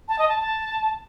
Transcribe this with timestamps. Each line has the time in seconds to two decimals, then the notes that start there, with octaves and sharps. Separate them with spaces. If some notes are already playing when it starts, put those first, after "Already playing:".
0.08 A5
0.19 D#5
0.29 A5
0.39 A5